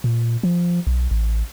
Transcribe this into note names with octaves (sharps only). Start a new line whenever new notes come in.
A#2
F3
B1
A1